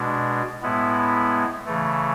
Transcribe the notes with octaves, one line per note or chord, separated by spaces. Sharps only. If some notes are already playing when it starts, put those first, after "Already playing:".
Already playing: B2 G#3 D4
A2 G#3 B3 E4
C#3 E3 A3